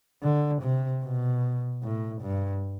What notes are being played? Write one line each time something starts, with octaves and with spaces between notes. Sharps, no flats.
D3
C3
B2
A2
G2